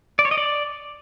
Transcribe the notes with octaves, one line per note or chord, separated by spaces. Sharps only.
D5
C#5
D#5
D5